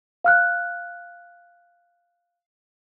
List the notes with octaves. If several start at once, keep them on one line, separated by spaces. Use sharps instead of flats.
F5 F6 F#6